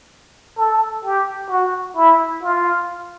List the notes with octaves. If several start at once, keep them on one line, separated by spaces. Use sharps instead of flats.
A4
G4
F#4
E4
F4